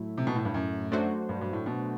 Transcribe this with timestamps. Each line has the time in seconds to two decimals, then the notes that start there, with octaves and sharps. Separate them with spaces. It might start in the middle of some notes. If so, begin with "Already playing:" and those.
Already playing: A2 F#3 A3 E4
0.18 C3
0.27 B2
0.36 A2
0.45 G2
0.54 F#2
0.92 F#3 A3 D4 F#4 C5
1.29 G2
1.41 G2
1.53 A2
1.66 B2